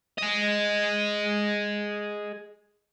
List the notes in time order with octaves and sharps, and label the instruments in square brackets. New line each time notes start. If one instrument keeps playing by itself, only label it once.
[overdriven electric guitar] G#4 D#5